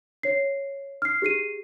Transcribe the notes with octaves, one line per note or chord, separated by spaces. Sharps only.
C#5 C7
F6 C7
G4 G#4 C7 D#7